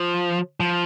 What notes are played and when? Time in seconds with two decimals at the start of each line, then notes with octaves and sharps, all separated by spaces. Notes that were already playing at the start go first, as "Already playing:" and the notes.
Already playing: F3
0.60 F3